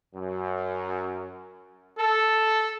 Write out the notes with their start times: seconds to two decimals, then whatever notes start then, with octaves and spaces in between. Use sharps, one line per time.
0.15 F#2
1.98 A4